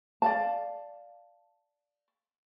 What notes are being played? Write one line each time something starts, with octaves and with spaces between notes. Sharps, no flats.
D5 F5 A5